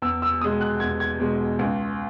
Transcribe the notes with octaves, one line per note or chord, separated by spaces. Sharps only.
E2 E6
E6
B2 G#3 D#6
F#6
E2 G#6
G#6
B2 G#3
C#2